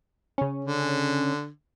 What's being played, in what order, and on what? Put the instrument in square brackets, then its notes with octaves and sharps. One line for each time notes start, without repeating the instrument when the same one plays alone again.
[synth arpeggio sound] C#3 C#4
[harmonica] D3